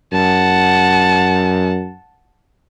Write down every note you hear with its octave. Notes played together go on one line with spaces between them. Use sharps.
F#2 F#5 A5